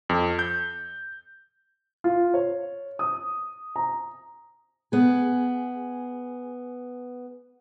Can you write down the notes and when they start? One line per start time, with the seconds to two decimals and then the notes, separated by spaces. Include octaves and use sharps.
0.09 F2
0.39 G6
2.04 F4
2.34 C#5
2.99 D#6
3.76 A#5
4.92 B3 G#4